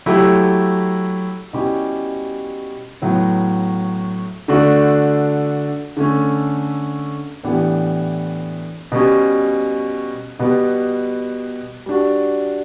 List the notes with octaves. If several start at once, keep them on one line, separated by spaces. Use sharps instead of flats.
F#3 A3 E4 G4
B2 G3 C#4 E4 G4
A2 F#3 B3
D3 A3 D4 F#4
D3 A3 C#4
A2 E3 B3 D4 G4
B2 G3 C#4
B2 G3 B3
G3 D4 F#4